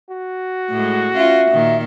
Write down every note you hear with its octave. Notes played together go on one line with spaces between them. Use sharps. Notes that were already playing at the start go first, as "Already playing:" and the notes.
F#4
A2 G#3
C#4 F4 E5
A#2 D#3